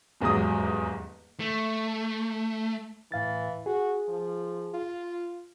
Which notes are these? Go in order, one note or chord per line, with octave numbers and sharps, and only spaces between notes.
D#1 E2 G#2 F#3 D#6
A3
A2 E3 F5 A6
F#4 G#4
F3
F4